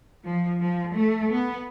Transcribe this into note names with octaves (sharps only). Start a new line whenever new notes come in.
F3
F3
A3
B3